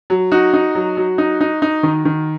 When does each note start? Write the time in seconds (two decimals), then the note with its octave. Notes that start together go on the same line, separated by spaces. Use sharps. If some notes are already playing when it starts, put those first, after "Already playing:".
0.10 F#3
0.32 D#4 F#4
0.53 D#4
0.75 F#3
0.97 F#3
1.18 D#4
1.41 D#4
1.62 D#4
1.83 D#3
2.05 D#3